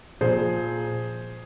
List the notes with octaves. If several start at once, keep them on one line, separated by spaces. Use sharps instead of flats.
A#2 F3 G#4 C5